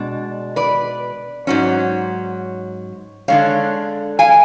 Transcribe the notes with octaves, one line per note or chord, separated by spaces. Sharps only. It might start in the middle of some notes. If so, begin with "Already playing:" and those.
Already playing: B2 G#3 D4 D5
B4 D5
G#2 F#3 C#4
D3 G#3 D4 C#5 F5
F5 G#5